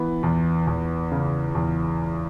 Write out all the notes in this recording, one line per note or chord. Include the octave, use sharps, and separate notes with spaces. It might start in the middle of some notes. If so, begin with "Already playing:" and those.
Already playing: E3 B3
E2
E2
C#3
E2